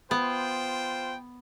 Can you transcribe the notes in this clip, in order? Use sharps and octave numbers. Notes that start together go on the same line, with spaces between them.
B3 F4 C5 G5